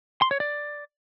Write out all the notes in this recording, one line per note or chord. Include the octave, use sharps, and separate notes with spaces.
C6
C#5
D5